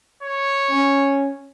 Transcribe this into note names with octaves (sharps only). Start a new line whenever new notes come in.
C#5
C#4